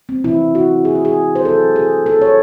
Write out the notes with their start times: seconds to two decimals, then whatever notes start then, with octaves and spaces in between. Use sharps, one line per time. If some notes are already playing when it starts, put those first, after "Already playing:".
0.09 C4
0.24 C3 E3 A3 E4
0.55 F#4
0.85 G#4
0.95 F#4
1.05 G#4
1.35 C5
1.45 C3 F#3 A3 A4
1.76 G#4
2.06 A4
2.21 C#5